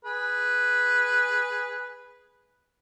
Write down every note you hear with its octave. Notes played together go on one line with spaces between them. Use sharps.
G#4 B4